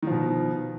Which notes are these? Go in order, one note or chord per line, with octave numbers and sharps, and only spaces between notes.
B2 D#3 F3